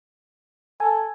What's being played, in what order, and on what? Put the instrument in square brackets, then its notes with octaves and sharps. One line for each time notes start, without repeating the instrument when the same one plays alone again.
[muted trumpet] A4 [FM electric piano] G#5